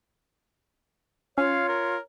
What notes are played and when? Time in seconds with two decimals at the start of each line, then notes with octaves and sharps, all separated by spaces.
1.38 C#4 F4 C#5 F5
1.69 A#4